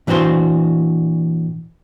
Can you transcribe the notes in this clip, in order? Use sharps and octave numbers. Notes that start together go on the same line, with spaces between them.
A#2 E3 D4 F#4 C5 C6